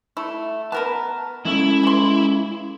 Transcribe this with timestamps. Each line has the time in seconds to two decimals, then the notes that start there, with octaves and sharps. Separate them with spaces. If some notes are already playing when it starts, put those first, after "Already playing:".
0.17 A3 E4
0.72 B3 A#4 B4 A5
1.45 G#3 C#4 E4 A4
1.83 E3 C6